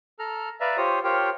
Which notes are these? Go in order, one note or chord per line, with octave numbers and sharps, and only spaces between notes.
A4 A#5 F6
B4 D5 E5 F5 A#5
F4 G4 C5 C#5 D#6
F4 G4 A#4 C5 C#5 G5